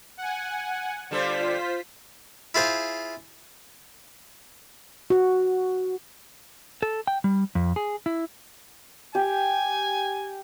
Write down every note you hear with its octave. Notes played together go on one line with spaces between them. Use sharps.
F#5 G#5
D3 G3 F4 A4 C5 B6
E4 F4 G#4 C5
F#4
A4
G5
G3
F2
G#4
E4
G4 G#5